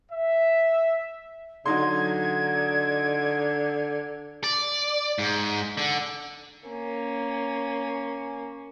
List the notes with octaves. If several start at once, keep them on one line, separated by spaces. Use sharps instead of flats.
E5
D3 F#3 D#4 C6 G#6
D5
G#2
D3
A#3 C#4